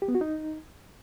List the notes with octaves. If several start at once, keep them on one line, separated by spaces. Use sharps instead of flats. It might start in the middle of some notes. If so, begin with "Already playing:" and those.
G4
B3
F#4
D#4